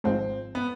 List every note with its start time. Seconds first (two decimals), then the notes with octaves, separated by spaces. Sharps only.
0.04 G#1 G#2 F3 G#3 C4
0.55 B3